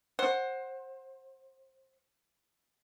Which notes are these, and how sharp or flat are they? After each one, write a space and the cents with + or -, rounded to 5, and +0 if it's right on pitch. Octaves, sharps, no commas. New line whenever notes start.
C5 +20 F#5 +0